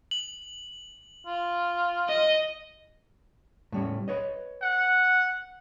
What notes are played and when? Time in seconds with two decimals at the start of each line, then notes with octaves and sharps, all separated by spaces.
0.11 F#7
1.27 F4
2.09 D#5
3.72 A2 G3 C#4
4.08 B4 C#5 D#5
4.62 F#5